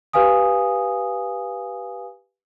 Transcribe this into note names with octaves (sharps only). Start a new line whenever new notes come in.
G4 B4 F5 G#5 D#6